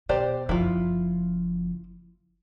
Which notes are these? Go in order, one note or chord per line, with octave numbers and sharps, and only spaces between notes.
B2 G4 C5 D5
F#1 F3 E4 F4